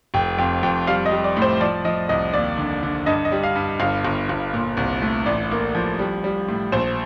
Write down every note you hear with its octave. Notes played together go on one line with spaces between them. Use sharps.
F1 G5
F2 G5
F2 G5
G3 F5
D#5
G3
D5
A2
C5
F3 D5
F3 D#5
C2 D#5
D#2 D5
D3
D3
G2 D#5
D#5
G3
F5
G2
G1 F5
G1
G1
A#2
C2
A3
A1 D5
A#3
F3
G3
G3
A2
A#1 C5